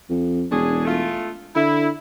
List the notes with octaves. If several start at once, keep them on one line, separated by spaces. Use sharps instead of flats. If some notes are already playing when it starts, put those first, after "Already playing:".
F2
E1 C#4 D4 G#4
A3 F4
D3 E4